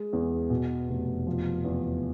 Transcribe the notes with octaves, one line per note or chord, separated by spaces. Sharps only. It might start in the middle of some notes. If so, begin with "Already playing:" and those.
Already playing: G#3
E2
B2
F1
F3
E2